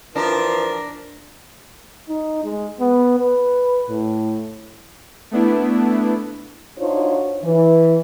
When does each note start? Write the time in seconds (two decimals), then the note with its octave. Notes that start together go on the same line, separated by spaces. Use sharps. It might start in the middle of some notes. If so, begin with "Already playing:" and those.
0.16 E3 F3 D4 A#4
2.08 D#4
2.44 G#3
2.80 B3
3.18 B4
3.90 A2
5.31 A3 B3 D4 E4
6.79 D4 D#4 F4 F#4 C5 C#5
7.43 E3